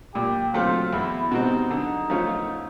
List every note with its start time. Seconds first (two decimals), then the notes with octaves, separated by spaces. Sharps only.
0.14 A#2 G4
0.54 F#3 A3 C4 F4
0.93 E2 E4
1.31 B2 G3 C4 D#4
1.71 D3
2.10 F3 A3 C#4 F4